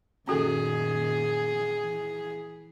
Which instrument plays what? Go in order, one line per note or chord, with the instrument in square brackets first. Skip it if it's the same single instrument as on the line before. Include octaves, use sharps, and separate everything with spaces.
[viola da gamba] F#2 A#2 D#3 [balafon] C#4 F#4 A4 [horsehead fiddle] G#4
[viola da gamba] E3